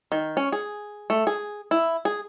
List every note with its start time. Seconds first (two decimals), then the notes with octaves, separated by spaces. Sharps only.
0.12 D#3
0.37 C#4
0.52 G#4
1.10 A3
1.27 G#4
1.71 E4
2.05 G#4